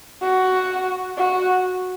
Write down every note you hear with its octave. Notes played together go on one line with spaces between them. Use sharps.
F#4
F#4